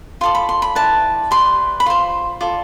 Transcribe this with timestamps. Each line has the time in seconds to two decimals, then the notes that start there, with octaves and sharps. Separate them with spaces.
0.21 F4 A4 D5 C6
0.35 B5
0.49 C6
0.62 B5
0.75 E4 B4 D5 A5
1.31 G4 B4 D5 C6
1.80 B5
1.86 F4 C5 C6
2.41 F4 A4 D5